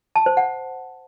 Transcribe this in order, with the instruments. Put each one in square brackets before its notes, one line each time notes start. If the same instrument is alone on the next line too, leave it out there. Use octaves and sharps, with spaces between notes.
[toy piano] A5
C5
F#5